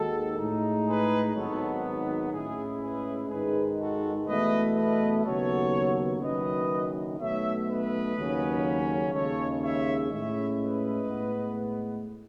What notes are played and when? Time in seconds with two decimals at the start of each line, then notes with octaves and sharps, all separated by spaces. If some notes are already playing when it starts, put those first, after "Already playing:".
Already playing: D#2 D#3 G#3 F#4 A4
0.38 A2 G#3 D#4
0.86 G#4 B4
1.35 G#1 G#2 D#3 F#3 B3 A4 C#5
2.32 A2 G#3 C#4 E4 G#4
2.81 G#4 B4
3.29 G#2 D#3 G#3 D#4 G#4 B4
3.79 F#4 A4
4.27 E2 B2 A3 E4 B4 D#5
4.76 B4 D#5
5.24 D#2 C#3 F#3 B3 A4 C#5
6.21 F#1 F#2 D#3 F#3 B4 D#5
7.19 B1 B2 A3 C#5 E5
7.68 B4 D#5
8.17 D#2 C#3 F#3 C#4
9.14 D#2 C#3 G#3 A4 C#5
9.63 C#5 E5
10.11 A2 G#3 C#4 E4 C#5 E5
10.61 B4 D#5
11.08 A2 G#3 B3